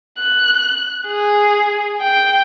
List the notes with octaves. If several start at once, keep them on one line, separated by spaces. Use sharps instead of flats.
F#6
G#4
G5